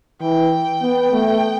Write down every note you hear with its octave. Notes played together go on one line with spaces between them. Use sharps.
E3 G5
B3
A3